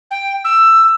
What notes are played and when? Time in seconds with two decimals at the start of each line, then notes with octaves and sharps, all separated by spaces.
0.11 G5
0.45 E6